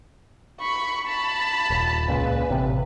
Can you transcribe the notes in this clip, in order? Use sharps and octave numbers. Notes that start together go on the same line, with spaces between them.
B5 C#6
A5 B5
D#1
C#2 A#2 C#3 B4
A1 C3